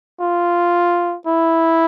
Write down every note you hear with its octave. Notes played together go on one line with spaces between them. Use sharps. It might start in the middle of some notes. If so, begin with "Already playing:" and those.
F4
E4